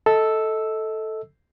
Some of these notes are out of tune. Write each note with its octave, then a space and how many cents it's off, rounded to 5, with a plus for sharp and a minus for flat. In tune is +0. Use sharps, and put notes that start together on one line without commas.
A4 +0 D#5 +30 E6 +0